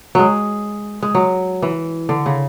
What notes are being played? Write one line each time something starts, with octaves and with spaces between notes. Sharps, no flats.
F#3 G#3
G#3
F#3
E3
D3
C#3